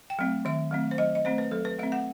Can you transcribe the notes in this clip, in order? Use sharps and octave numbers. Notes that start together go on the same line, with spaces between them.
G5
F#3 A3 C4
D#3 E5
F#3 A3 C4
C5
F#3 D#5
D#5
A3 C4 C5
B4
F#3 A4
B4
A3 C4 E5
F#5